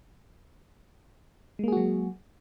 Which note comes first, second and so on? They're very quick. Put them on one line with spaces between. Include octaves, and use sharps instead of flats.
G#3 A#3 G#4 F#4 F#3